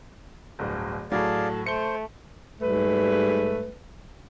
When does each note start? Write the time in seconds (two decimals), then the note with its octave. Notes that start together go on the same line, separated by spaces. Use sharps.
0.59 D1 G1
1.12 A2 F#3 G#4 A4 D5 F5
1.66 A3 C5 C#7 G7
2.61 G#2 G3 A3 B4